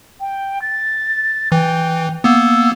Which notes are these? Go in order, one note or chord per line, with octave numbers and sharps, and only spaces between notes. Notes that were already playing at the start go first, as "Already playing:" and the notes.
G5
A6
E3 G5
A#3 B3 E6